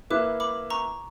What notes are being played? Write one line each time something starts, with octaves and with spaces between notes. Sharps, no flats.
A#3 E4 B4 E5 D6 F#6
B5 D6
A#5 C#6